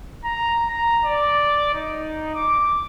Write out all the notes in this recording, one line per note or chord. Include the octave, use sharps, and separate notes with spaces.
A#5
A#5
D5
D#4
D6